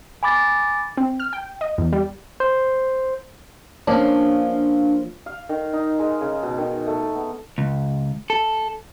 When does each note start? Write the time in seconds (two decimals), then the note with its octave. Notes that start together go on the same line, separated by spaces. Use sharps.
0.23 G#5 B5 D6 A6
0.97 C4
1.20 F6
1.33 G5
1.61 D#5
1.78 E2
1.93 G3
2.40 C5
3.87 F3 A#3 C#4 D4 F5
5.26 F5
5.49 D#3
5.73 D#4
5.99 G#3
6.21 C#3
6.43 B2
6.58 D#3
6.86 A3
7.15 B3
7.58 C#2
8.30 A4